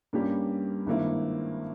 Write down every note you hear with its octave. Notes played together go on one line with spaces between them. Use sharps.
G2 G3 A#3 C#4 G4
G#1 G2 D#3 A#3 E4